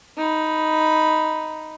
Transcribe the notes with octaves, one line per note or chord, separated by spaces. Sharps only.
D#4 B5